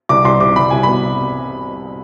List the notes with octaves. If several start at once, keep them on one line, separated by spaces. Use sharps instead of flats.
C2 D6
C2 C6
C3 D6
C2 B5
C2 G#5
B2 B5